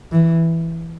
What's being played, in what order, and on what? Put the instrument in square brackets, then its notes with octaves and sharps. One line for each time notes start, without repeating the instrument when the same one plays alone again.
[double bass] E3